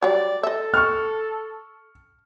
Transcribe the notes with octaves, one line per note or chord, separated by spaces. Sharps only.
F#3 G3 D5
A4 D#5 E5
C#6 F6